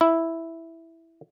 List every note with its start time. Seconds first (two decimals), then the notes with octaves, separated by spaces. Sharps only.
0.01 E4